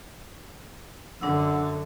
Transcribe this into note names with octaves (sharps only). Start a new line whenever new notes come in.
F#2 D3 D4 F#5 E6